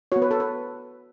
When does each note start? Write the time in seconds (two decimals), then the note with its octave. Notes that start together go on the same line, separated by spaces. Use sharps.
0.12 B3 F#4 C#5
0.22 B4
0.31 A4
0.40 B4